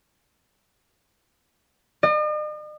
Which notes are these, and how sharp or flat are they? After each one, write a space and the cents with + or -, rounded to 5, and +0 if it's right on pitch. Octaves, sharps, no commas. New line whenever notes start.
D#5 -45